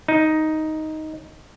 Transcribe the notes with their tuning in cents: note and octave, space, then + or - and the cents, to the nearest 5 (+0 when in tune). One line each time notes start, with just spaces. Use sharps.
D#4 +5